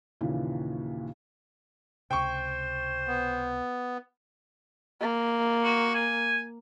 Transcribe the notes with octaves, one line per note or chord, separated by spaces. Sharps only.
D#2 A#2 C#3 E3
C#2 C3 C5 G5 C#6
B3
A#3
F#4
G#5